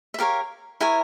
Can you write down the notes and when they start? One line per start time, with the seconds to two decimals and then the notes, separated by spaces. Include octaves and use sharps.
0.14 E5
0.19 G4 A#4 C#5 F5
0.81 E4 A#4 C#5 G#5